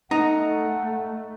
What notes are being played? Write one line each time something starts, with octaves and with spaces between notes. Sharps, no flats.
A3 D#4 F#5 A#5